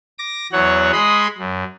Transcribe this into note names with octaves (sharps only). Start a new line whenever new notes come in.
D6 A#6
E2 F#3 C#5 F#5
G#3 G#4 D#5 B5 C6 D#6
F#2